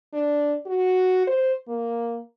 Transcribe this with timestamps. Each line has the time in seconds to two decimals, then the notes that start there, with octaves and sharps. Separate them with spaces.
0.13 D4
0.66 F#4
1.27 C5
1.68 A#3